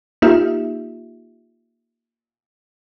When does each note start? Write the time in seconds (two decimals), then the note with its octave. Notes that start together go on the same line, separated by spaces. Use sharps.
0.22 A#3 D#4 F4 G4 E5